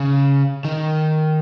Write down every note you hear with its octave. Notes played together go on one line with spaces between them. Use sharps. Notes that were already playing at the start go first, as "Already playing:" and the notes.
Already playing: C#3
D#3